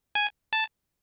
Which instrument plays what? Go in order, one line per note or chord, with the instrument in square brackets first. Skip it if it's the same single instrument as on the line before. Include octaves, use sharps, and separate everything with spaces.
[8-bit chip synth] G#5
A5